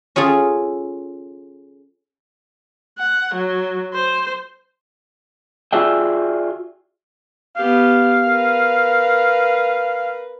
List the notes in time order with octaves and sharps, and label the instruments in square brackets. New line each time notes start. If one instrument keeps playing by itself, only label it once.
[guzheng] C#4 F4 G#4 A4
[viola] F#5
F#3
C5
[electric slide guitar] F4 F#4 G#4 D5 E5 G5
[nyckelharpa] B3 G4 [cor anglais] F5
[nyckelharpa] A#4 B4